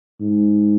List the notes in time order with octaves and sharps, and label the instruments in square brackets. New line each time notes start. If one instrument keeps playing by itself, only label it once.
[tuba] G#2